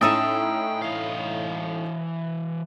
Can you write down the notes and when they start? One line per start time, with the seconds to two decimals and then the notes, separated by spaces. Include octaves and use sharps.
0.01 A2 C#4 D#4 E5 G5 A5 A#5 D#6
0.82 E3 F5